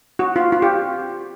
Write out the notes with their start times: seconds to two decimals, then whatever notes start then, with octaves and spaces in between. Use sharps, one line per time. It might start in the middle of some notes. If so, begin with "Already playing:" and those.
0.19 F#4
0.36 F4
0.52 F4
0.62 G4